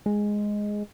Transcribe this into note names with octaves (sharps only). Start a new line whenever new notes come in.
G#3